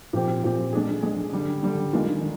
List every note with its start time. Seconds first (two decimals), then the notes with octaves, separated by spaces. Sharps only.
0.13 A#2 F3 C4 G4
0.43 A#2 F3 C4 G4
0.73 G#3 D4 G#4
1.03 G#3 D4 G#4
1.32 D3 G3 D4
1.63 D3 G3 D4
1.92 D#3 G#3 D4 F4 A#4
2.21 D#3